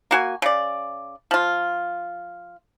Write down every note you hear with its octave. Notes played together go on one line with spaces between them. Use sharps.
A#3 F#4 G#5
C#3 D5
F3 F4